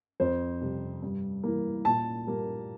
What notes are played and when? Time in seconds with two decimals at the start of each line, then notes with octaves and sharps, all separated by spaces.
0.20 F2 C5
0.61 C3 G3
1.02 G2
1.43 E3 A#3
1.85 A#2 A5
2.27 G3 A#3